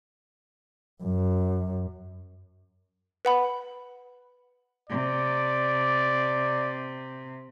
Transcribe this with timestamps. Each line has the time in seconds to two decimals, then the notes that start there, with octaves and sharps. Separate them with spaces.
1.03 F#2
3.25 B4 F#5 B5
4.89 C3 D5